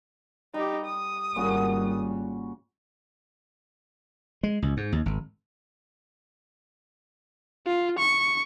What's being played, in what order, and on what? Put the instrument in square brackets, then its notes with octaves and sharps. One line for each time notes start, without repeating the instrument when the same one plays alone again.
[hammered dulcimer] G3 [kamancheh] D#4 G4
[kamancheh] D#6
[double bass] G#1 G3 [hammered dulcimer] A#2 C#3 F#4
[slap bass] G#3
C#2
G#2
D#2
G#1
[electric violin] F4
C#6